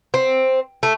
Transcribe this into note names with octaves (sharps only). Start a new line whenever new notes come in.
C4
A3